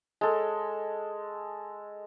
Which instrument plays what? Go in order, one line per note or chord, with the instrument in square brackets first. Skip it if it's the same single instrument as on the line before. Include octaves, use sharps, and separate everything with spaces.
[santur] G#3 A4